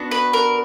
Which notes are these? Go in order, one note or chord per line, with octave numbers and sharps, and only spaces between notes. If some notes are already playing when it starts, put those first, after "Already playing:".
Already playing: B3 D4 F#4
B4
A#4